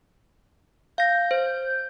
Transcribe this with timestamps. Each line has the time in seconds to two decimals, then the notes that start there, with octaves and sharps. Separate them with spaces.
0.98 F5 G6 A#6
1.31 C5